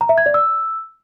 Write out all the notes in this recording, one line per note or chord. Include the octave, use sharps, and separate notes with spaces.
A#5
E5
G#6
D5
E6